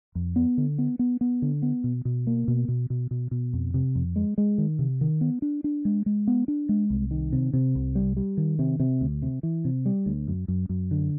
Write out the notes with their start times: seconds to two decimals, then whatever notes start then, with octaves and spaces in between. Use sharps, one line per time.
0.15 F2
0.36 B3
0.58 D3
0.78 B3
0.99 B3
1.21 B3
1.42 D3
1.62 B3
1.84 B2
2.05 B2
2.27 A#3
2.48 B2
2.68 B2
2.90 B2
3.11 B2
3.31 B2
3.53 F2
3.74 C3
3.95 F2
4.16 G#3
4.38 G#3
4.58 D#3
4.79 C3
5.01 D#3
5.21 B3
5.42 D4
5.64 D4
5.85 G#3
6.06 G#3
6.27 B3
6.48 D4
6.69 G#3
6.90 C2
7.11 D#3
7.32 C3
7.53 C3
7.75 C2
7.95 G3
8.17 G3
8.37 D#3
8.59 C3
8.80 C3
9.01 D2
9.22 C3
9.43 E3
9.65 C3
9.86 G3
10.06 D2
10.28 F#2
10.48 F#2
10.69 F#2
10.91 D3